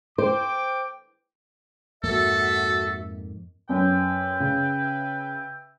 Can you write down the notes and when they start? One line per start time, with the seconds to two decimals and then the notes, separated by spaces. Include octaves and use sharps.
0.18 C5 G5 D6
2.04 F2 G#2 A#3 F#4 A4 E5
3.69 F#2 B4 E5 G5
4.40 C#3